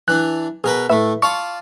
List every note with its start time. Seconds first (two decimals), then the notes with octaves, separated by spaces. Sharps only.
0.08 E3 D4 F#6
0.64 B2 G#4 A#4 B4
0.90 A2 A3 B4 E5
1.22 F4 D5 A5 C#6